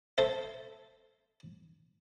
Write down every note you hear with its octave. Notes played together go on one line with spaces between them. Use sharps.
A4 C5 E5